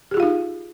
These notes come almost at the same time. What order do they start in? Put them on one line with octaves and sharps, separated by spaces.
G4 G#4 F4 F5 D#4